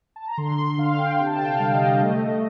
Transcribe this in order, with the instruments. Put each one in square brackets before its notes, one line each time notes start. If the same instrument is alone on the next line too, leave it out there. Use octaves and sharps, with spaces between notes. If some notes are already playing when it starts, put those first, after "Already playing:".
[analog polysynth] A5
A#5
D3 C6
C6
D3 F5
F5
G5
C3 G5
A5
G5
F5
G3
D#5
A3